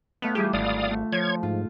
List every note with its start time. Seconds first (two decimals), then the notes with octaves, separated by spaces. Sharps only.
0.22 A2 A3 B3 F5
0.35 E3 G3 F4 G4 G#4
0.53 G#1 G2 D3 D5 F5 D#6
0.90 A3
1.13 F3 C#5 G#6
1.43 G#2 F4